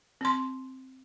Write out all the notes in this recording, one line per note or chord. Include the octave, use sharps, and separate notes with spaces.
C4 C6